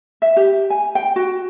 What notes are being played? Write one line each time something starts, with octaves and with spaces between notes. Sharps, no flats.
E5
G4
G#5
G5
F#4